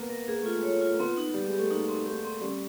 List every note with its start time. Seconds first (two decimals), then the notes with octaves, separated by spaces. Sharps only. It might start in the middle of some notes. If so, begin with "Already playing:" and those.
Already playing: A#3 B3
0.09 A#4
0.27 A#3 G#4
0.41 A3 F4
0.56 G#3
0.63 C#5
0.69 A3
0.81 F4
0.94 A#3
1.00 B3 C4
1.17 D#4
1.34 G3 G4
1.46 G#3
1.52 G4
1.58 A3
1.70 A#3 D#4
1.89 C4
2.05 A3 G4
2.24 C4
2.41 G3 C#4